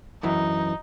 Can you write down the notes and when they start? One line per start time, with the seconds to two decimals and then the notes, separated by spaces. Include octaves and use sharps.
0.23 F#2 E3 D#4